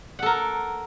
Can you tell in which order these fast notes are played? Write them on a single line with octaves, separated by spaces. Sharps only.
F#5 A4 A#4